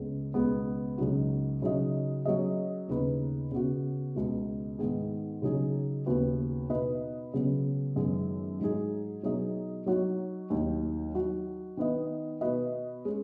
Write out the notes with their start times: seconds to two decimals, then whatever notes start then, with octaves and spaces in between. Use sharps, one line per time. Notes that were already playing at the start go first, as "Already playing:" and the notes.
Already playing: C#2 C#3 B3
0.34 C#2 B2 G#3 B3
0.98 C#2 C#3 F#3 D#4 F#4
1.62 C#3 F#3 D#4 F#4 D#5
2.25 F#3 C#4 G#4 D#5
2.88 D#2 C#3 B3 D#4 B4
3.51 C#3 B3 F#4
4.15 C#2 B2 G#3
4.79 G#2 D#3 B3 G#4
5.42 C#3 F#3 D#4 G#4
6.06 D#2 C#3 B3 F#4 B4
6.69 B2 B3 D#4 B4 D#5
7.34 C#3 F#3 B3
7.96 F#2 D#3 G#3 B3 G#4
8.59 G#2 F#3 D#4 G#4
9.23 B2 F#3 D#4 G#4 D#5
9.86 F#3 D#4 F#4 C#5
10.50 D#2 D#3 F#3 D#4
11.14 F#3 D#4 F#4
11.77 D#3 B3 D#4 B4 D#5
12.41 B2 B3 F#4 B4 D#5
13.05 G#3 C#4